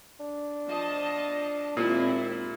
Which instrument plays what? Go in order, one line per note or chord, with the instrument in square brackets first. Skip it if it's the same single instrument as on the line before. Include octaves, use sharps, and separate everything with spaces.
[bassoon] D4
[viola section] F3 D#5 A5
[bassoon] D#2 [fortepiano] A#2 [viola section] G#3 C4 E4